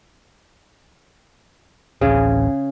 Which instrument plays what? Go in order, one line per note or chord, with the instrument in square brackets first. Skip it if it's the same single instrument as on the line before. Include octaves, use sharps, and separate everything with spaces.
[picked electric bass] D1 A1 [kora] C#3 G#4